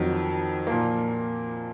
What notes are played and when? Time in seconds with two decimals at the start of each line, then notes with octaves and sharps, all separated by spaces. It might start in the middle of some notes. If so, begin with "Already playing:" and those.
Already playing: F2 D#3 F#3
0.67 A#2 F3 A#3